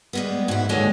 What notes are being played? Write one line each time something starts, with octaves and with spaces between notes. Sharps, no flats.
G3 G#3 B3
G#2 E4
D#2 D3 G#3 C#5 G#5